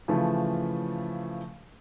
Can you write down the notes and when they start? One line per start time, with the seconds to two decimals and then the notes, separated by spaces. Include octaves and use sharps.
0.08 C#3 E3 F3 A3